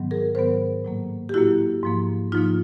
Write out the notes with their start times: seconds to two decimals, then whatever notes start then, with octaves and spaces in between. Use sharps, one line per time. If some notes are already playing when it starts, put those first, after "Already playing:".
Already playing: G#2 D#3 F#3 B3
0.11 G#4 A#4
0.35 G#2 D#3 F#3 B3 A#4 C5
0.84 A2 F#3 A#3
1.29 G4
1.34 A2 F#3 A#3 E4 F#4
1.83 G#2 F3 A#3
2.32 G#2 F3 A#3 D#4 F4